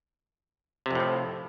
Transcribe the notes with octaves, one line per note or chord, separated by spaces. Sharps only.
F2 A2 C3 F3